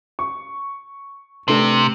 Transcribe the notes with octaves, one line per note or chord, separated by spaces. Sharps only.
C#6
C3 A3 D4 B4